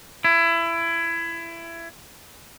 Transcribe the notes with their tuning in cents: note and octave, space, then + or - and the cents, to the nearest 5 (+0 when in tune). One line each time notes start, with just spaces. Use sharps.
E4 +25